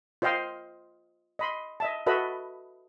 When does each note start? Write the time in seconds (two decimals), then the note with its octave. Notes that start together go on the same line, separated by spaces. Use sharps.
0.22 F4 C5 D#5 F5 G5 C6
1.39 D#5 B5 C6
1.80 D#5 E5 A5
2.06 F#4 A4 B4 D#5 E5 B5